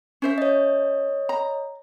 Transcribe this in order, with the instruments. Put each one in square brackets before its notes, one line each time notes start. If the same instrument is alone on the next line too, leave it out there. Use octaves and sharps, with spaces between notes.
[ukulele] C#4 C5 E5
[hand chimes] C#5 D#5
[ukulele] A#5